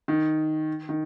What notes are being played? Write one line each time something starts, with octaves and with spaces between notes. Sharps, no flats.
D#3
D#3